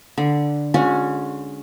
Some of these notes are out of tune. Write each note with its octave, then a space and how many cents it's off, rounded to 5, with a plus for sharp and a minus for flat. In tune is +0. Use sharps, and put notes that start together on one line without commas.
D3 +0 B5 -30
G#3 +0 C#4 +0 F#4 -40